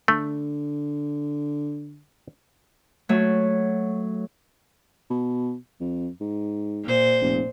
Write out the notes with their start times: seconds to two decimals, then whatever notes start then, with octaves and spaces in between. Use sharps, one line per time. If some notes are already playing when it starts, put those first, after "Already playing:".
0.08 D3 A3
3.09 F#3 A3 C#5
5.10 B2
5.80 F2
6.21 G#2
6.84 A#2 C5
7.21 F1